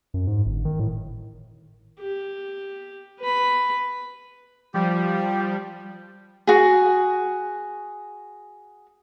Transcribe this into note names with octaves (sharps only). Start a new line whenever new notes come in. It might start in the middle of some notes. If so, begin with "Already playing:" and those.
F#2
G#2
G1
D#3
A2
G4
B4 B5
F3 G3 G4
F#4 G#4